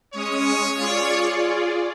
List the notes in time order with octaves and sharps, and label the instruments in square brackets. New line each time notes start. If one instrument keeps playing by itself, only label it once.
[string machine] G#3 C#4 D#6 [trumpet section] C#5
[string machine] F4 G#4 D5